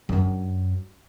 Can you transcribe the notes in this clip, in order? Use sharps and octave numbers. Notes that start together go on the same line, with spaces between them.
F#2 D4